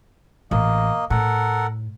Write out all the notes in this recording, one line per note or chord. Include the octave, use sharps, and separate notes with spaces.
A1 A#3 D#5
A2 A4 A#4 F#5